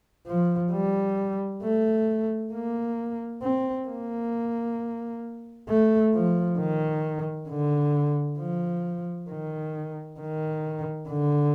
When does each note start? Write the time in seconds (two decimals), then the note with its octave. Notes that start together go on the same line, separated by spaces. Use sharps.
0.27 F3
0.72 G3
1.63 A3
2.53 A#3
3.42 C4
3.88 A#3
5.69 A3
6.14 F3
6.58 D#3
7.49 D3
8.39 F3
9.30 D#3
10.20 D#3
11.09 D3